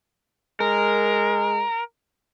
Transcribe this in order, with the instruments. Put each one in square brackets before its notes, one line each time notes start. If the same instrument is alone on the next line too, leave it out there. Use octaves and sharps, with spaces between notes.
[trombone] G#3 [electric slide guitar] A#4